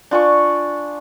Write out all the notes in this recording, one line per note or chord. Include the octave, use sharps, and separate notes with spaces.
D4 F4 G#5 C#6